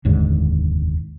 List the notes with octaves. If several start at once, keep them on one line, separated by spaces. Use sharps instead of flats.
F1 D#2 G#2 D3